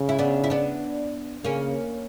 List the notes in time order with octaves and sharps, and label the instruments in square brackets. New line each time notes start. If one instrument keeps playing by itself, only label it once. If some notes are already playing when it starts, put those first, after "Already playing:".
Already playing: [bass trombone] C#3
[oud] E4
B3 D4
E4
B3 D4
[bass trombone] C#3 [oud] A#3 C#4